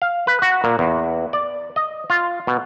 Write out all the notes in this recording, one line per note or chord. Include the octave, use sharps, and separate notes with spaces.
F5
B4
F#4
A#2
E2
D5
D#5
F4
B2